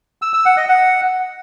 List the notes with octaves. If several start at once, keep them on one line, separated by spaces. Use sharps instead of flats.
E6
E6
F#5
D#5
F#5